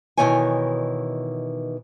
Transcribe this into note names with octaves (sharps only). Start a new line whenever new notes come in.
B2 D#3 E3 B3 C#5 G#5